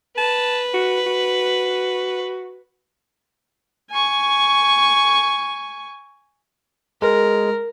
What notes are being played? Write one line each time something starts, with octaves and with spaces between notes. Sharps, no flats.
B4 A5
F#4
F#4
G#5 C#6
G#3 A#4